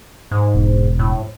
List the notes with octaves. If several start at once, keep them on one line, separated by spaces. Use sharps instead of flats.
G#2
E1
A2